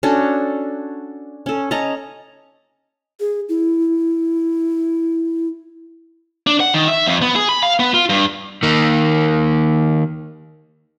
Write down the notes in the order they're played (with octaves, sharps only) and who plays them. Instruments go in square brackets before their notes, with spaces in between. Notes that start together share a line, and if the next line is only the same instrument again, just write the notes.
[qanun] C#4 D4 F#4 A4
C#4 A4
C#4 D#5 A5 A#5
[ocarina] G#4
E4
[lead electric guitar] D4
F#5
D#3
E5
F2
B3
G#4
B5
F5
B3
F4
G2
[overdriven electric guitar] D#3 A#3